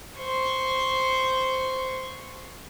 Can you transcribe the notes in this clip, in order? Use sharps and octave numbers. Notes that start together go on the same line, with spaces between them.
C5 C#6